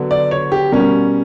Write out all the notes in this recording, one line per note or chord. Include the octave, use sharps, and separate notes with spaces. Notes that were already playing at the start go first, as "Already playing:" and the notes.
Already playing: D3 F#3 B3 D4
D5
C#5
G4
B2 G3 C#4 A#4